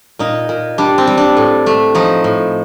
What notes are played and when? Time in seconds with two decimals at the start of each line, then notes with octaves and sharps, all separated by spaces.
0.19 A#2 D#4
0.49 A#2
0.78 G3 D4
0.98 C4
1.07 G3
1.17 D4
1.37 A2
1.66 A3
1.95 F3 D#4
2.24 A2